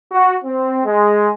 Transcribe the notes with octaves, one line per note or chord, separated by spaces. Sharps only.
F#4
C4
G#3